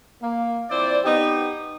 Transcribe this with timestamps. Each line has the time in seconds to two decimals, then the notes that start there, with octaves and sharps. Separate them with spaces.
0.23 A#3
0.70 F3 C4 E4 C5 D5
1.05 B3 D#4 G4